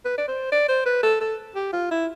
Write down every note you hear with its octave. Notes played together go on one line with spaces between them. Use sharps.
B4
D5
C5
D5
C5
B4
A4
A4
G4
F4
E4